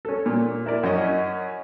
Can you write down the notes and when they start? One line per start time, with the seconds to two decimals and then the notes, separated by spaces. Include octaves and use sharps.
0.05 C#4 A4
0.26 A#2
0.66 E4 A#4 D5
0.83 F#2 C#4 D#5